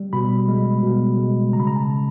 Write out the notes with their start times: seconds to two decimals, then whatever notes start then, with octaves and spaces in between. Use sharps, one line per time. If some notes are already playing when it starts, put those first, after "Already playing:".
Already playing: G3
0.13 B2 B5
0.48 G#3
0.83 B2
1.18 G#3
1.53 C#3 A#5
1.60 B5
1.67 A#5
1.76 A5
1.88 C#3